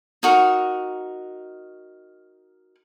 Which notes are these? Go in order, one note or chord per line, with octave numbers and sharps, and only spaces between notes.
D#4 F#4 A#4